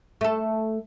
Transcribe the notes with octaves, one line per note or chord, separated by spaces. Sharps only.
A3 A4